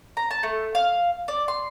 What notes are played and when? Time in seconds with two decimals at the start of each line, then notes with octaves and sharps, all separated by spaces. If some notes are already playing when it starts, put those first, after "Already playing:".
0.17 A#5
0.31 A5
0.43 A3
0.75 F5
1.28 D5
1.48 C6